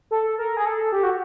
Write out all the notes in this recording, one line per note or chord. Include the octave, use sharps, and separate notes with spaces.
A4
A#4
G#4
A4
G4
F#4